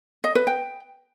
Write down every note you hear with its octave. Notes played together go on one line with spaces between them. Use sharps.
D#5
B4
G5